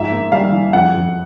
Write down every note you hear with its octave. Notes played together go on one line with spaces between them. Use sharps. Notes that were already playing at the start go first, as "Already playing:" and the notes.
Already playing: G#2 F3 E5
A#3
G3 F5
E3
F2 F#5
F2